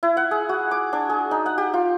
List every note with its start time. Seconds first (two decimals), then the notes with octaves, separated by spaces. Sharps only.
0.03 E4
0.17 F#5
0.31 G#4
0.49 F#4
0.71 D6
0.93 D4
1.09 G#4
1.31 D#4
1.46 F#5
1.58 G4
1.74 F4